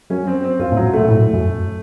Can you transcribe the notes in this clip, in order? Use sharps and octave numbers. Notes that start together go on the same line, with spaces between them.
F#2 C#4
C4
C4
F#2 F4
A2
F#3
A#2 A3
A2
F#2